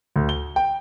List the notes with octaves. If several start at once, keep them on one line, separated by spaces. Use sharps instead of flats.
D2
G7
G5